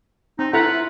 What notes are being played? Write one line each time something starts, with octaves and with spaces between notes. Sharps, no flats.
C4 D#4
E4 F4 A4 B4 F#5 A#5